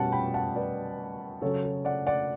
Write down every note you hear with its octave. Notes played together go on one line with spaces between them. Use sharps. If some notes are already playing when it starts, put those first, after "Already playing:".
Already playing: B2 G3 C#4 F#5 A5
G5 B5
F#5 A5
B4 D5
C#3 F#3 C#4 A4 C#5
A4
D5 F#5
D5 F#5